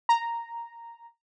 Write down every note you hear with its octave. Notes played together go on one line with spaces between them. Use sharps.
A#5